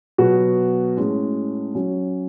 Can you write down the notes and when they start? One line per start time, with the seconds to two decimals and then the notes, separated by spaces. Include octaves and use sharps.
0.18 B2 F#3 B3 F#4
0.97 A2 G#3 C#4
1.75 F#3 C#4 F#4